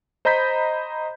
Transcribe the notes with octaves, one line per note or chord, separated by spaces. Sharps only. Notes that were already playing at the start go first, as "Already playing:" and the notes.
C5 D#5 A#5 B5 G6 B6